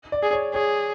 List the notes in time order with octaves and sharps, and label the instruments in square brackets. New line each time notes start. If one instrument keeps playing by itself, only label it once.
[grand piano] D5
[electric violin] G#4
[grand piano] C#5
[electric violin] G#4 [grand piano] C#5